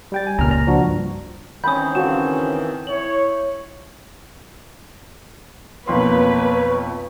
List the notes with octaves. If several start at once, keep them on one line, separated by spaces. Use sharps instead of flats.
G3 G5 A6
G#5
C#2 A#2 A#5 F6
A#5
F3 D4 F#4
G2
D#3 E3 C4 C#4 G#5 B5 D#6 G6
C#3 C#4 F#4 A4 F5 E7
E4 C#5 F#7
B1 F2 A#3 B4 C#5 C6